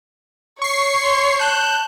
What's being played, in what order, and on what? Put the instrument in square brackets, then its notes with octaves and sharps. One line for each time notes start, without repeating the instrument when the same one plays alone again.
[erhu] C#5 [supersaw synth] C#6 C7
[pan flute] C6
[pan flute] A5 [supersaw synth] F#6 G6